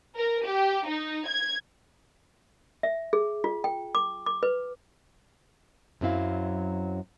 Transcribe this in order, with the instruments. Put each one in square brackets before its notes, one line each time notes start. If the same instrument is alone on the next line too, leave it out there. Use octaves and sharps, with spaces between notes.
[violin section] A#4
G4
D#4
G#6
[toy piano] E5
G#4
F4
G5
D6
D6
B4
[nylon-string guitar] F#2 F#3 C4 E4 F5